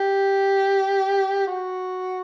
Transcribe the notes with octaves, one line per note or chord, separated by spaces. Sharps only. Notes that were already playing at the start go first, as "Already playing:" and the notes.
Already playing: G4
F#4